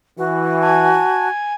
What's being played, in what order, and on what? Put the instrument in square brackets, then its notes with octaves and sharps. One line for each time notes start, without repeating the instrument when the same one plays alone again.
[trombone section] E3 [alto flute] F#4
[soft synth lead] G#5 [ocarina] A5